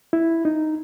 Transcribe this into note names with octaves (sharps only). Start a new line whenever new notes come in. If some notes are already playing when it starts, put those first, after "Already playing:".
E4
D#4